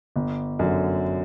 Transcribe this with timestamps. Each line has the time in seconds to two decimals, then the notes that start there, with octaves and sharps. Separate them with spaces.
0.16 G1
0.59 F#2 D3